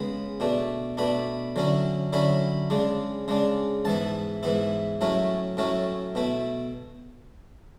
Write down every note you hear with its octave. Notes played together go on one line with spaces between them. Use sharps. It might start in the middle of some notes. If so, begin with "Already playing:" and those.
Already playing: C#3 G#3 B3 B5
B2 A3 D4
B2 A3 D4 B5
D3 F#3 C#4 E4
D3 F#3 C#4 E4 B5
C#3 G#3 D4
C#3 G#3 D4
G#2 E3 B3 E4 A5
G#2 E3 B3 E4
A2 F#3 A3 C#4 E4
A2 F#3 A3 C#4 E4
B2 A3 E4